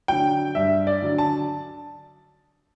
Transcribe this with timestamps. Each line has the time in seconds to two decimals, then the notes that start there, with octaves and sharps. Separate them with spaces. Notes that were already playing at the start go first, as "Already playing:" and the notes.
0.08 D3 F#3 G5
0.55 G2 E5
0.87 D5
1.02 D3 F#3
1.18 A5